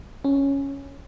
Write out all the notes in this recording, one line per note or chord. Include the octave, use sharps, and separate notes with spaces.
C#4